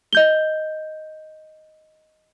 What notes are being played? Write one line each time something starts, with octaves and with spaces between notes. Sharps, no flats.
D#5 G6 G7